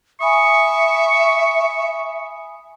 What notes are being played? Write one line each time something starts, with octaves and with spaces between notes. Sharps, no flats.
E5 G#5 B5 C#6 D#6